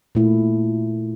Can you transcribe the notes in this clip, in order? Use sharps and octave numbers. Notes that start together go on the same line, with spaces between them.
A#2 A3 E4